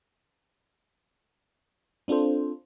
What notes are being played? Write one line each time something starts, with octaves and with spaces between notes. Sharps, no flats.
C4 D4 F4 A4 C5